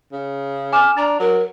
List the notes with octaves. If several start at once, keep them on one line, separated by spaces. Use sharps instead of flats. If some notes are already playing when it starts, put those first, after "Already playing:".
C#3
G#5 D6 F6 E7
D4 A#5 A6
F#3 A#4